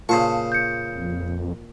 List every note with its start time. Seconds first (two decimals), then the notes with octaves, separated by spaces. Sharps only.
0.09 A#2 C#3 C5 A5 C#6
0.52 G6 C#7
0.95 F2